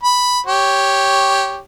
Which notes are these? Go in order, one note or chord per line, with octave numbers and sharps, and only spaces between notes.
B5
G4 C#5